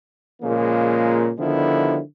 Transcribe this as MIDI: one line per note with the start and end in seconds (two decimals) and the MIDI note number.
0.43 1.30 46
0.43 1.30 49
0.43 1.30 53
0.43 1.30 56
0.43 1.30 58
1.39 1.98 50
1.39 1.98 51
1.39 1.98 53
1.39 1.98 55
1.39 1.98 59
1.39 1.98 64